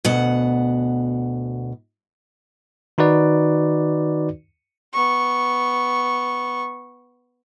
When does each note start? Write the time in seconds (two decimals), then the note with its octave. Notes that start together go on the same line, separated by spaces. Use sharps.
0.05 D2 B2 F#5
2.98 D#3 D#4 F#4 B4 D5
4.94 B3 C#6